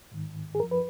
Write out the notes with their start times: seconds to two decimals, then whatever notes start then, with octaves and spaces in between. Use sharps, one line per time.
0.12 G#2 D#3
0.55 G#4
0.60 F#2 A#4
0.63 F3
0.71 B4